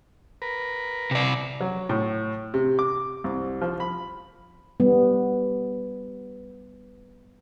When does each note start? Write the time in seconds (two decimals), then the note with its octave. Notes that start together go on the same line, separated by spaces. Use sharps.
0.42 A#4 B4
1.11 C3 D5
1.61 F#3
1.89 A2
2.54 C3
2.79 D6
3.24 C2
3.61 F3
3.80 B5
4.80 G3 B3